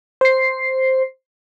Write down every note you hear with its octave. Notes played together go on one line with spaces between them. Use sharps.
C5 C7